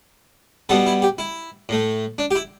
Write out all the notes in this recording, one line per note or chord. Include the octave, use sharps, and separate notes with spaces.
B2 G3 B3 A4
E4
G4
E4
A2 A3
D4
G4
E4